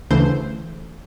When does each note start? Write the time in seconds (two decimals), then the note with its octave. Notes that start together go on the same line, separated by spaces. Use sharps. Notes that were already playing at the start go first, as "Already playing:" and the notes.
0.10 D2 C#3 E3 A3 C5